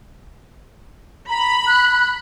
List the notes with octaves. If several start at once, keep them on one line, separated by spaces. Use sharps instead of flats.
A#5 B5
F#6